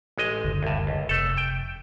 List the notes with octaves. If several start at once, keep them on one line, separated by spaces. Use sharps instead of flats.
A1 G#3 D#5
F#1 D2
C2 G2
C#2
F1 A3 A4
G5